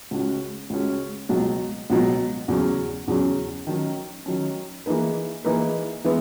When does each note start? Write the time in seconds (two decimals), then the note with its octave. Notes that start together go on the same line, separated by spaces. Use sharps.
0.11 C#2 C#3 G#3 C#4 F#4
0.70 C#2 C#3 G#3 C#4 F#4
1.29 C#2 B2 F#3
1.90 C#2 B2 F#3
2.48 E2 C#3 F#3 C#4
3.08 E2 C#3 F#3 C#4
3.67 D#3 F#3 C#4
4.26 D#3 F#3 C#4
4.86 E3 A#3 D#4 G#4 B4
5.45 E3 A#3 D#4 G#4 B4
6.04 E3 G#3 B3 E4